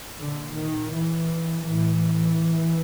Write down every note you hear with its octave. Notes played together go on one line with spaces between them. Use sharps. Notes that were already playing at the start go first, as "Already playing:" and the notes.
A#2 D3
D#3
E3
A2 E3